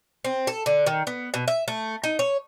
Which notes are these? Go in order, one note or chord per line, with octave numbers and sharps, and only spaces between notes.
C4
A4
D3
D#3
B3
B2
E5
A3
D#4
C#5